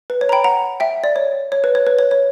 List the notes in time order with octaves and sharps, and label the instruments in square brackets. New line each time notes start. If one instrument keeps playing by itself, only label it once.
[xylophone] B4
C#5
A#5
G5 B5
F#5 A#5
E5 G5
D5
C#5
C#5
B4
C#5
B4
C#5
C#5